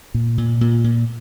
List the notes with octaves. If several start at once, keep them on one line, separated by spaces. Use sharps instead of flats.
A#2
A#2
A#2
A#2